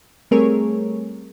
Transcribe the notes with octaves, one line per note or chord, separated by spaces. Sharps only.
G3 A3 C4 G#4 A#4 C#5